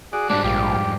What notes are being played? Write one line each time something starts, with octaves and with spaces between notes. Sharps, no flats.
F#4 G#4 D5
G#2 G3 G#3 D4
A#1 F3 G4
F2